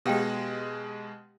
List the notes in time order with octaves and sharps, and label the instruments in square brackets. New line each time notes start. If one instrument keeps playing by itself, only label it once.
[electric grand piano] B2 G#3 [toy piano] G4 F5 G5